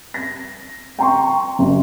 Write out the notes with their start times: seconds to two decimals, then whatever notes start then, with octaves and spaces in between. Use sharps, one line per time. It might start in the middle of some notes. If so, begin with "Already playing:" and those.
0.14 A#6
0.99 G5 A#5 C6 C#6
1.59 F#1